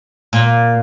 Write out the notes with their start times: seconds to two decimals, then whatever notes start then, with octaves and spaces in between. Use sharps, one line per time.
0.33 A#2